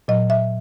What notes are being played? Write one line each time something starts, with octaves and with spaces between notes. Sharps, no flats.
A#2 F#3 D#5
E5